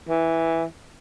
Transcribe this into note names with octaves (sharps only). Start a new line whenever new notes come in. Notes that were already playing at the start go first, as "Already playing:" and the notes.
E3